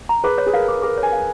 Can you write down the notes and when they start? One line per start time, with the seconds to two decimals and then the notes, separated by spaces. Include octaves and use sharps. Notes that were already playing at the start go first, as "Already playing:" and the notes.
0.09 A#5
0.24 G#4 B4
0.38 C#5
0.47 G#4
0.53 A#4 F5
0.68 G#4
0.82 G#4 A#4
0.98 C#5
1.03 G#5
1.12 F5